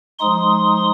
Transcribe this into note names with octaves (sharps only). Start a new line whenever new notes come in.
F3 G#3 D#4 C6 D#6